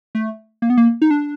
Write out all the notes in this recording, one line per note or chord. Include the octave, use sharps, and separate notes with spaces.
A3
A#3
B3
A#3
D#4
D4